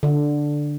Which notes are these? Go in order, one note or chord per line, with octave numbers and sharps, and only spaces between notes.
D3